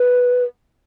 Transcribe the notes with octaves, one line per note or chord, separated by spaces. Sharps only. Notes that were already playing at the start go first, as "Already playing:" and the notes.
Already playing: B4